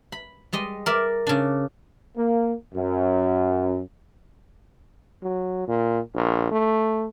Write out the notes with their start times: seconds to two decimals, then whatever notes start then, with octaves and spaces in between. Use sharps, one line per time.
0.12 B5
0.53 G3 G#3 D#5
0.86 A#4 D5 E5
1.27 C#3 D4
2.16 A#3
2.74 F#2
5.23 F#3
5.67 A#2
6.15 A#1
6.51 A3